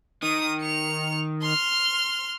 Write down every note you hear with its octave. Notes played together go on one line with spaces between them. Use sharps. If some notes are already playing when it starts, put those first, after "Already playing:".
D#3 D#6
C#7 F7
C6 F6